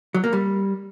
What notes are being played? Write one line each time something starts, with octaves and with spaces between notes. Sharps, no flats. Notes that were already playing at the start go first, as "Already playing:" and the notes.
F#3
A#3
G3